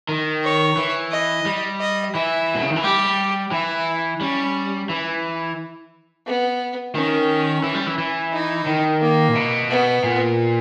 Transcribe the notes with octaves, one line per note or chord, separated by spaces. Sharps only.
D#3
C#5
E3
D#5
G3
D#5
E3 E5
B2
C#3
D#3
E3
G3 G4
E3 E4
G3 C#4
E3
B3
D#3 C#4
E3
G3
E3
E3
D#4
D#3
A#3
A#2
B2
B3
A#2